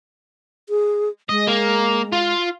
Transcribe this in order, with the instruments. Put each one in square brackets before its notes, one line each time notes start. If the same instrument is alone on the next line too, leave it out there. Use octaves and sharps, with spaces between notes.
[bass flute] G#4
[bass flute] G#3 [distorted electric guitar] D#5
[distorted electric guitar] A#3
F4